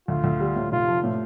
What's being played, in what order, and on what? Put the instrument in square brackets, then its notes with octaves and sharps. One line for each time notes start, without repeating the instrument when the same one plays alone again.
[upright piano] D2 [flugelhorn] F4
[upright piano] D2
G3
A2
[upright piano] F1 [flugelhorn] F4
[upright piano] F3
A2